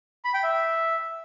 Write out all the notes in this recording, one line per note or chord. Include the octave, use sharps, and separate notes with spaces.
B5
G5
E5